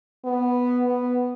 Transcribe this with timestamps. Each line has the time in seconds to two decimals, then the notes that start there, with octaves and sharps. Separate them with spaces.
0.25 B3
0.86 B3